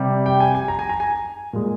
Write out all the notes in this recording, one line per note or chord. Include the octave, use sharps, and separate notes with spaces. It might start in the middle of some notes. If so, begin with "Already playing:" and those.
Already playing: C3 G3
G5
G#5
G#5
A#5
G#5
A#5
G#5
A#2 G#3